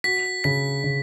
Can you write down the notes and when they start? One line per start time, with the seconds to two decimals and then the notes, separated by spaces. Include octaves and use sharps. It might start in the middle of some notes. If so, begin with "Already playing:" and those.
0.04 F#4 B6
0.44 C#3 B6
0.84 C#3